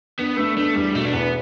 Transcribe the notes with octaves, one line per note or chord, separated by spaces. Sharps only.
B3 D4
A3 B3
A3 D4
E2 G3
B2 A3
D4
E2 B3